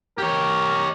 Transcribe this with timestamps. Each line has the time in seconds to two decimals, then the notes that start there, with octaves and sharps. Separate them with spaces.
0.18 G4 A#4 C#5